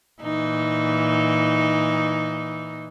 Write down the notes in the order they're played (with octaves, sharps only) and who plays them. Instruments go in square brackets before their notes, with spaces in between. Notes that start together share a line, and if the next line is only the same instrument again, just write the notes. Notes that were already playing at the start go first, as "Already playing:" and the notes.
[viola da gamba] A#2 E3 D#4